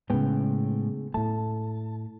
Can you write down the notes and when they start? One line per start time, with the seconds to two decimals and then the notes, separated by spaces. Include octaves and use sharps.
0.10 A2 C#3 G#3 B3 G5
1.14 A2 A3 A5